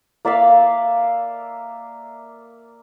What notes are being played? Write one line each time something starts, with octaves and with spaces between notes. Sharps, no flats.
A#3 D5 E5 F5